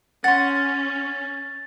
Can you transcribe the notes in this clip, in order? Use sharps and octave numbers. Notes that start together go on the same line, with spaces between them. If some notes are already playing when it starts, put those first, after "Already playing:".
C#4 F#5 C6 A6